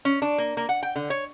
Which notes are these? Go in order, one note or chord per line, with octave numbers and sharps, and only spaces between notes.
C#4
D4
A#3
A#3
F#5
G5
D3
C#5